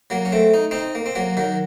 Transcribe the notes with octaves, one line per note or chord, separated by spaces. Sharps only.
F#3 A#3
C#4
A3 C4
D#4
C4 D#4
A#3
C4
F#3 A#3
D#3 F#3